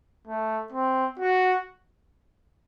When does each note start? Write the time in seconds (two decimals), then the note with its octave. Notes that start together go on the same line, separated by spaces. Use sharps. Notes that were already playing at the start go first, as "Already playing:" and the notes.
0.27 A3
0.73 C4
1.19 F#4